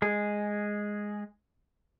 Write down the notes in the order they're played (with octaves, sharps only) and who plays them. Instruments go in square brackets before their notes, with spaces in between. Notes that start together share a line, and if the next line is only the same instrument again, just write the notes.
[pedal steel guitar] G#3 G#4